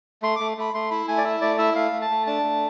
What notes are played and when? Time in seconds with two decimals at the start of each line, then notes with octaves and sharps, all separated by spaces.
0.22 A3 C6
0.36 A3 D6
0.57 A3 B5
0.74 A3 C6
0.91 E4 B5
1.08 A3 G#5
1.18 D5
1.24 E4 E5
1.41 A3 D5
1.58 E4 E5
1.75 A3 F5
1.93 A3
2.01 A5
2.10 A3
2.27 D4 A5
2.43 A3